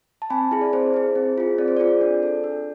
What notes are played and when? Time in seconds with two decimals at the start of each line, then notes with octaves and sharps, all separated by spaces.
0.22 A5
0.30 C4 G#5 B5
0.51 E4 G#4
0.61 D5
0.73 C4 C5
0.94 E4 G#4
1.15 C4
1.38 F4 G#4
1.58 C4 D5
1.68 C5
1.77 F4 G#4 D5
2.01 D4
2.23 A4
2.44 D4